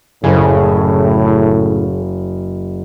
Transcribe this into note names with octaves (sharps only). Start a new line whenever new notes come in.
F#1 A2 C#3 G#4